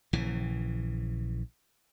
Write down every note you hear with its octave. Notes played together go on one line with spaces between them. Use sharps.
A#1 C#3 E3